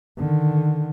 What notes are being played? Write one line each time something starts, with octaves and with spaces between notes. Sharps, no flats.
D3 D#3